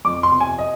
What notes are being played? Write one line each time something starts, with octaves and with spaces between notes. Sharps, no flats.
F2 D6
C6
C3
G#5
D#5